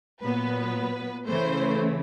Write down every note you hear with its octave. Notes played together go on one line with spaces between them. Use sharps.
A#2 F#3 B3 B4
C#3 E3 A3 C5